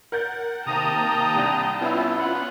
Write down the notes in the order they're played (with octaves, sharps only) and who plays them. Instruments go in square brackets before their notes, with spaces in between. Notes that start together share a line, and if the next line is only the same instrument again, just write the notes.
[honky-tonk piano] A#4 G6 A6 [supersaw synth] F#5
[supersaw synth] C3 D#3 A#3 [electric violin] G5 A5 [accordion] A#5 D#6
[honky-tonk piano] C2 D4 F7
[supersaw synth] B3 C#4 F4 [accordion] E4
[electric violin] F#5 [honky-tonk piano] B5